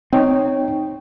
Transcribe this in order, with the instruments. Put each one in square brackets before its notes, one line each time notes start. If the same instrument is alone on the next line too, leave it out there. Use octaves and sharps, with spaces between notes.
[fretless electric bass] C4 [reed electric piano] D#4 C#5 G5